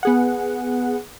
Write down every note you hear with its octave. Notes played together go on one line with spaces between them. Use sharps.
B3 G#4 F#5